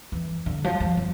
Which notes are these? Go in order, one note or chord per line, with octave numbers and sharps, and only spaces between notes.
E3
D3
F3
F3
F3